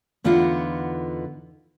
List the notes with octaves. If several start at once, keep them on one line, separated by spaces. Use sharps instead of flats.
E2 D3 B3 D#4 F4 F#5